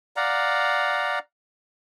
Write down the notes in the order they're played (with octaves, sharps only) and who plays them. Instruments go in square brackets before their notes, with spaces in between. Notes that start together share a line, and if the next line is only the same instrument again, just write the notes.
[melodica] D5 F5 F#5 A#5